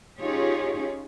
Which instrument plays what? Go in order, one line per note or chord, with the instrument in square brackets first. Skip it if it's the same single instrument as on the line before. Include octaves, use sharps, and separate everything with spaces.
[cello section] C#4 D#4 F4 G4 G#4 C#5